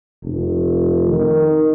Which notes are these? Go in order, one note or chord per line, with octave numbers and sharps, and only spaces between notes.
F1
D#3